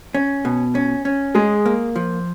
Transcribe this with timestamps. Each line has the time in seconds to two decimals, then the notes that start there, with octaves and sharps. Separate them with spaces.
0.15 C#4
0.45 B2
0.75 C#4
1.05 C#4
1.35 G#3 G#4
1.66 A#3
1.96 F3